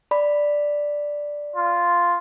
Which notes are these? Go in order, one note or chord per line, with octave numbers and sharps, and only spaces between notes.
D5 B5
F4